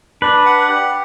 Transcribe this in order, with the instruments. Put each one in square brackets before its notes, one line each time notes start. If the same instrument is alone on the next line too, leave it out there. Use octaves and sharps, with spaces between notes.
[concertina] D4 [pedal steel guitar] B4
[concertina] F#5
G4